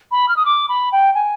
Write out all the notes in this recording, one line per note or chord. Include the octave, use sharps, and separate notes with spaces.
B5
F6
D#6
D6
B5
G5
G#5